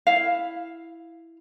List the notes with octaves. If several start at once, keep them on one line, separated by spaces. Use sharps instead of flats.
E4 F5